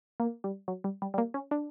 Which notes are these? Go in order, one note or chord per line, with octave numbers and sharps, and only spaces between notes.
A#3
G3
F#3
G3
G3
G3
A#3
C#4
D4